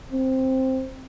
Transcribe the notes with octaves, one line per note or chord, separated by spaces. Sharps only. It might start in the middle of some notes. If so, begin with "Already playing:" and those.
C4